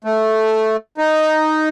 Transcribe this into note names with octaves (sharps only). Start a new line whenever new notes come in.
A3
D#4